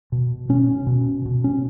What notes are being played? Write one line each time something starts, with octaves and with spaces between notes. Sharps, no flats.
B2
B2 C#4
B2
B2
C#4